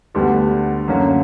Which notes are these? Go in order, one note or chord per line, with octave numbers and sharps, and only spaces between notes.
D2 D3 G3 B3
F#2 D3 A#3 C#4